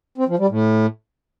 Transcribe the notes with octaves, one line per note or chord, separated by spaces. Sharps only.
C4
F3
G3
A2